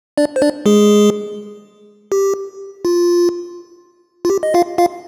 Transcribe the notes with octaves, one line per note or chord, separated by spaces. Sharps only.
D4 D5
C5
D4 D5
G#3 G#4
G4
F4
F4
G4
D#5
F4 F5
F4 F5